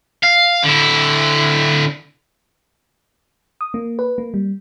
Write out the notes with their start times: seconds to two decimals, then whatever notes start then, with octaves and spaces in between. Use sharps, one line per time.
0.23 F5
0.64 D3 E4
3.61 D#6
3.74 A#3
3.99 B4
4.18 A#3
4.34 G3